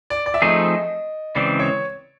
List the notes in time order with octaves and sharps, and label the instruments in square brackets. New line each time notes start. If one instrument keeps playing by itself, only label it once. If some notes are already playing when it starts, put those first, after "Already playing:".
[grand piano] D5
D5
E5
[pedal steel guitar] F3 A3 C4 D#4 G#4 [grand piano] D#5
[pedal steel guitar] C#3 E3 G#3 C4 [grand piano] D5
[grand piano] C#5